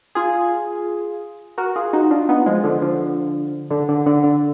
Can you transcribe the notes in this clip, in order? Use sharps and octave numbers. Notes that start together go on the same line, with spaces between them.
F4 G#4
F#4 A#4
F4 G#4
D#4 F#4
D4 F4
B3 D#4
F3 G#3
D3 F3
D3 F3
D3
D3
D3
D3